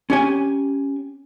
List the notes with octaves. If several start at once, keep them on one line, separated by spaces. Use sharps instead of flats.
C#4 G4 G#5